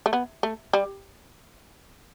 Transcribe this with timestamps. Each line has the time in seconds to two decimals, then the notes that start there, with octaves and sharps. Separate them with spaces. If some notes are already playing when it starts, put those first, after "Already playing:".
0.06 A3
0.13 B3
0.43 A3
0.73 G3